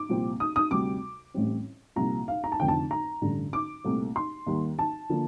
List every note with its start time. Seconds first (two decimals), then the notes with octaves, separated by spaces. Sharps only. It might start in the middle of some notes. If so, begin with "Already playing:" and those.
Already playing: D6
0.09 C2 A#2 F3 C4
0.40 D#6
0.56 D#6
0.71 D2 C3 G3 D6
1.34 A1 A2 G3 C4
1.96 C2 A#2 F3 A#5
2.28 F5
2.44 A#5
2.52 A5
2.60 F1 F2 D3 G5
2.68 A5
2.91 A#5
3.22 A1 G2 D3
3.53 D6
3.84 C2 A#2 A3 C4
4.16 C6
4.46 D#2 D#3 G3
4.79 A5
5.10 D3 F3 A#3